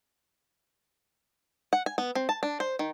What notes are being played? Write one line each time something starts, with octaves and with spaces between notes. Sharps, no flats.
F#5
G#5
B3
C4
A5
D4
C5
D#3